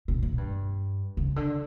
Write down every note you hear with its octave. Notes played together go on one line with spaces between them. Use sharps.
B2
A#2
G2
C#3
D3